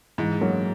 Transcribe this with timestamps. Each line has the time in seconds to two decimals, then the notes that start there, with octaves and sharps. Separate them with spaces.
0.18 G#2 E3 G#3
0.41 F#3 A#3